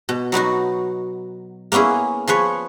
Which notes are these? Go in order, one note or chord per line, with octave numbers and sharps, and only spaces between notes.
B2
F#3 B3 D#4 F#4
A#3 B3 C#4 E4 G#4
F3 G#4 B4 C#5